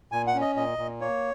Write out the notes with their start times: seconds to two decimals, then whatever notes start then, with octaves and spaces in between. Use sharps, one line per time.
0.12 A#2 G#5
0.27 F#5
0.34 C#4
0.41 D#5
0.56 A#2 D#5
0.78 A#2
1.01 A#3 C#5